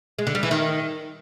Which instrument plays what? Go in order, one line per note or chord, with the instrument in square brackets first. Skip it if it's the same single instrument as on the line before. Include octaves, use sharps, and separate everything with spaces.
[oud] G#3
D3
G3
E3
D#3